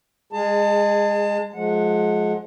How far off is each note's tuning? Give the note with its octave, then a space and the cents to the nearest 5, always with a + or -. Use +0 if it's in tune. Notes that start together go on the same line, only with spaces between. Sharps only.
G#3 -20 G#4 +0 A5 +30
F3 +35 G#3 +30 F#5 -15